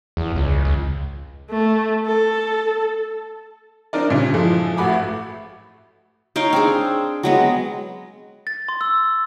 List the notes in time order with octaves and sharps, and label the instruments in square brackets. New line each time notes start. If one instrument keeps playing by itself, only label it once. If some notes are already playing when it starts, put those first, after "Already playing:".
[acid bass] E2
C#2
C#2
[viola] A3
A4
[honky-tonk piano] C4 D4 D#4 A#4 D5
G2 A#2 C#3
E3 F3 G#3 A4
A1 A3 F#4 B5 D6
[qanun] D#4 C#5 F5 G5
C4 D4 G#4
F#3 G#3 B3
[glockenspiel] A6
C6
E6